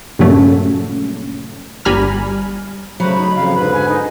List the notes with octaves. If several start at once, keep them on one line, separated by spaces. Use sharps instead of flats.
G2 A#2 C#3 F#3 A3 C#4
G1 G3 G#5 A#5 B5 F6
C#3 F#3 A3 C5 B5
D#4
F2 C#3 F5
G#2 D3 B4 B5
G#5
D#4